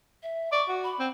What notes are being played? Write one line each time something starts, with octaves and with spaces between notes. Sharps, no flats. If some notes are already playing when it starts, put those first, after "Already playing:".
E5
D5 C#6
F#4
B5
C4